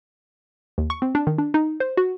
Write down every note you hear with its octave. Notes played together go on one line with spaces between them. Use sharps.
D#2
C#6
C4
D4
D#3
D4
D#4
C5
F#4